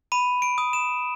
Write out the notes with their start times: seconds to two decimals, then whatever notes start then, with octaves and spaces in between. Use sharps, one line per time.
0.12 B5 D#7
0.42 D7
0.58 D#6
0.73 E7